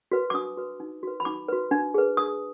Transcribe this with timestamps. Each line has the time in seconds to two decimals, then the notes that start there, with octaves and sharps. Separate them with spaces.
0.12 F#4 B4
0.30 D6
0.34 D4 D#6
0.57 F#4 B4
0.80 D#4
1.03 F#4 B4
1.20 B5
1.25 D#4 D6
1.49 F#4 B4
1.71 D4
1.94 G#4 B4
2.17 D4 D#6